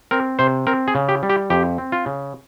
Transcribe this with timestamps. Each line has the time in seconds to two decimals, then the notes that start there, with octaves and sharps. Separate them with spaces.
0.11 C4 A#4
0.39 C3 C5
0.67 C4 A#4
0.88 G#4
0.95 C#3
1.09 G4
1.23 G3
1.29 G4
1.50 F2 G4
1.78 C4
1.92 F4
2.06 C#3